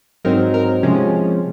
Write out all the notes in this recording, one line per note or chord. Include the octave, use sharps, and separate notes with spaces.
G#2 F#3 C4 D#4 A#4
A#4
C3 F3 G#3 C#4